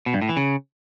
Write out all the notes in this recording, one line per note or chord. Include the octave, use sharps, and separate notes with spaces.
B2
G2
A2
E3
C#3